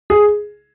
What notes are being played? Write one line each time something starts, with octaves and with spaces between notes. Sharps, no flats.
G#4